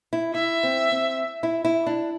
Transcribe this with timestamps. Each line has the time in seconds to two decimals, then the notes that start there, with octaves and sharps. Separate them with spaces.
0.13 E4
0.35 E4 E5
0.63 C4
0.92 C4
1.43 E4
1.65 E4
1.86 D4